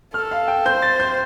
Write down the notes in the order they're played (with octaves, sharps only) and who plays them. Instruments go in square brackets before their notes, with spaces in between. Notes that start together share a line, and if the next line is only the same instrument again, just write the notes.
[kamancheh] A4 [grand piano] F6
[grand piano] F5
G5
[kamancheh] C5 [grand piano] G6
[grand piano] A6
G6